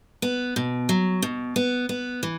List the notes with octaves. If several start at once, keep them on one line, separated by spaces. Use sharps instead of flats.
B3
B2
F#3
B2
B3
B3
E3